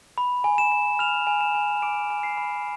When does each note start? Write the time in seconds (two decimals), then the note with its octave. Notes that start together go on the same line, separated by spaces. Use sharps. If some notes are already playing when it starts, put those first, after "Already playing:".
0.18 B5
0.44 G#5
0.58 E7
0.72 G#5
0.99 F6 F7
1.27 G#5
1.41 E7
1.55 G#5
1.82 D6 D7
2.10 G#5
2.23 C7
2.37 B5